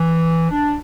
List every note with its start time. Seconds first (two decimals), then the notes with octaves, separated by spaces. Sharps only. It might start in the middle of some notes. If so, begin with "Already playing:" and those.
Already playing: E3
0.50 D4